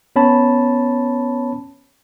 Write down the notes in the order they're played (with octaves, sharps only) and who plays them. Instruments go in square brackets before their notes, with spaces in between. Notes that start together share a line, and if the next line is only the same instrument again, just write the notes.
[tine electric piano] B3 C#4 C#5 A5 B5